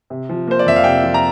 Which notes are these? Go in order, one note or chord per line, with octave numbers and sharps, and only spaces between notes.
C3
F3
A#3 C5
D5
F2 E5
F5
C3 G5
F3
A#5